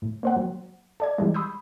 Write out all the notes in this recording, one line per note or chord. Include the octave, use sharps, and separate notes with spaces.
A2
A#3 C5 F#5
F#3
A4 D5 G#6
E3 G3 G#3
B5 C6 D#6 E6 G6